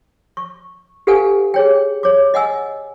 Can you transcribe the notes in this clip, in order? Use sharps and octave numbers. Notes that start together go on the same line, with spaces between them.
C#6
G4 A4 B4 F5 F#5 G#5
G#4 C#5 G5
C#5 D6
D#5 F#5 G#5 E6